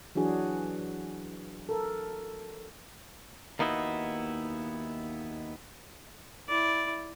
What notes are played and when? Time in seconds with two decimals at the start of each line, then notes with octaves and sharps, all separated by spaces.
0.15 E3 F#3 D4 F#4 G#4
1.69 A4 A#4
3.59 D#2 A#3 B3 D#4 E4 F#4
6.48 E4 D5